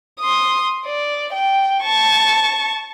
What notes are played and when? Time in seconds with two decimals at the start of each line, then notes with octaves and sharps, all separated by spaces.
0.20 C6 D#6
0.86 D5
1.33 G5
1.83 A5 C#6